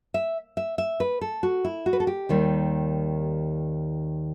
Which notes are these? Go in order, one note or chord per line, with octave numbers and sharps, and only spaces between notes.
E5
E5
E5
B4
A4
F#4
E4
F#4
B4
A4
G4
D#2 D#3 G3